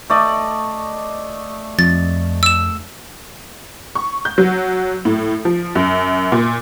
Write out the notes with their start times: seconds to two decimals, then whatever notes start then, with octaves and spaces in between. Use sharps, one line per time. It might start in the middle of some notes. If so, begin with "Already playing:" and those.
0.10 A3 D5 D#5
1.79 F2 A6
2.43 E6 E7
3.95 C#6
4.25 G6
4.38 F#3
5.05 A2
5.45 F3
5.75 F#2
6.32 A#2